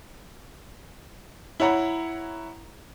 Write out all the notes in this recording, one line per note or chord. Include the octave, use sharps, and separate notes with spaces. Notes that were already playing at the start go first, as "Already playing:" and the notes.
E4 C#5 F#5 A#5 B5